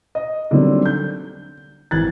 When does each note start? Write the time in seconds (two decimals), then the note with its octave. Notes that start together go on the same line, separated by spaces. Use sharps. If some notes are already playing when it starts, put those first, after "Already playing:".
0.15 D#5
0.51 D3 D#3 F#3 G3 C4
0.86 G6
1.91 G#1 E3 F#6 G#6 A6